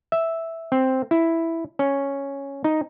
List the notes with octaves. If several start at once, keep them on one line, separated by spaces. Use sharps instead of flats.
E5
C4
E4
C#4
D#4